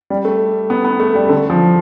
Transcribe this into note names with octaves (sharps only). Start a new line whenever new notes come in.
G3
A3
B3
B3
A3
G3
D3
F3